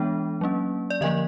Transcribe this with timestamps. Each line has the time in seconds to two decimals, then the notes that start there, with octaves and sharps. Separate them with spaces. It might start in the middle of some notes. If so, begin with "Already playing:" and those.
Already playing: E3 G#3 B3 D4
0.41 F#3 A#3 C#4
0.90 D5
1.01 D3 F3 A#3 D#5